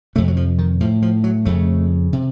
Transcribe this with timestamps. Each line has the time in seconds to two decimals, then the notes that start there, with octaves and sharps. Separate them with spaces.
0.15 F2 C3 A3
0.28 F#3
0.37 F3
0.58 D#3
0.80 A2 F3
1.02 F3
1.24 F#3
1.45 F2 C#3 A3
2.13 C3